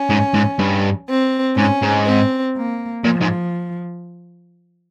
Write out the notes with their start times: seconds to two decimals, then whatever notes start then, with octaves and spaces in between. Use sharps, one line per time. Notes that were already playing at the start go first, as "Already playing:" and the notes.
Already playing: C#4
0.10 G#2
0.34 G#2
0.59 G2
1.08 C4
1.57 G#2 C#4
1.82 G#2
2.06 C4
2.55 A#3
3.04 A#2 F3
3.20 G#2